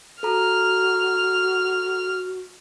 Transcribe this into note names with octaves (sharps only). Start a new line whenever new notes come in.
F#4 A4 A#5 F6